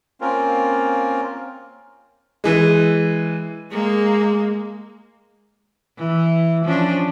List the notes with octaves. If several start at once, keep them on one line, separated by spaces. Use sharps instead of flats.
A#3 C4 C#4 F4 A#4
E3 G#3
G#3 A#3
E3
F3 C#4 D4